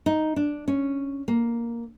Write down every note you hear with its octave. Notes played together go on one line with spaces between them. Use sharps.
D#4
D4
C#4
A#3